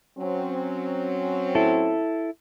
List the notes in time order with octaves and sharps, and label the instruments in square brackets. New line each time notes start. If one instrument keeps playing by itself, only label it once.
[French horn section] F#3 C4 C#4
[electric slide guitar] E4 A4